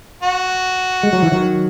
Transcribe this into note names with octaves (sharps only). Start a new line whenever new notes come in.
F#4
G#3
F#3
E3
D#3 F#3